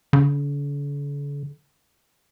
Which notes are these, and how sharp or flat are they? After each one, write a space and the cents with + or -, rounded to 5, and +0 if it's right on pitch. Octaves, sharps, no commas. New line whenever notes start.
D3 -45